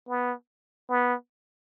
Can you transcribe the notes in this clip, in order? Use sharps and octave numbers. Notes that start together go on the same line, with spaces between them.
B3
B3